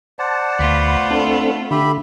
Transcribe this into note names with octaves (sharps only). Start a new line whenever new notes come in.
C5 D5 F#5 A5
D2 A3 B3 F4 B5
C4 D4 A4
D3 G4 E5 B5